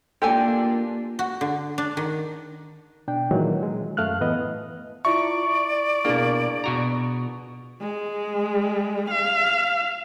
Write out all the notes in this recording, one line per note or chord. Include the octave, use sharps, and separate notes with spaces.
A#3 D4 F4 G4 A4 G#5
F#4
D3
D4
D#3
B2 D4 G5
A#2 D#3 E3 F#3 G#3
G#3
F#2 A3 F5 F6 F#6
A2 E3 B3 D#5
E4 F4 D5 E5 C#6
B2 A#3 D4 E4 G#4
B2 F#4 A#5
G#3
F5